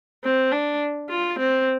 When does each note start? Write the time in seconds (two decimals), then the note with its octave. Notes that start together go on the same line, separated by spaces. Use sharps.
0.24 C4
0.52 D4
1.10 F4
1.39 C4